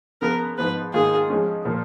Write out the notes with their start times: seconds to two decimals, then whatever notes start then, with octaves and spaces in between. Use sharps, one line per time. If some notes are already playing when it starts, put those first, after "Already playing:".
0.21 C#3 F3 B3 A#4
0.58 G#2 F3 B3 B4
0.94 G#2 D#3 A#3 F4 G#4
1.30 F3 G#3 C#4
1.65 A#2 F3 A#3